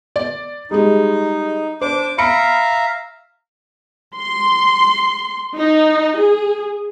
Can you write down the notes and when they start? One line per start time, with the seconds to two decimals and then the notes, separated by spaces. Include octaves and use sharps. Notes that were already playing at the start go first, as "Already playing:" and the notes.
0.16 D5
0.71 G3 G#3 D#4
1.81 D4 C5 D6
2.18 E5 F5 A#5 B5 C#7 D7
4.14 C6
5.58 D#4
6.17 G#4